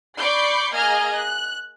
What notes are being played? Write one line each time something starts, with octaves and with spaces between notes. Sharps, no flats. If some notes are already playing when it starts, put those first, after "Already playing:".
D5 B5 C#6 D6 G6 C7
A#3 G#4 D#5 F6 G#6
F#6